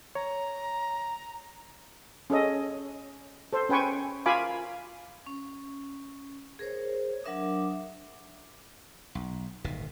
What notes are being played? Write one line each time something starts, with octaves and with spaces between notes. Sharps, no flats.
C#5 A#5
C#4 G#4 A4 D#5
A4 C5
C#4 B4 G5 G#5 C#6
F4 A#4 F5 G#5 B5 D6
C#4
G#4 A#4 C5 C#5
F#3 D4 A#4 E5 D6 D#6
B1
D1 G1 B2 D#3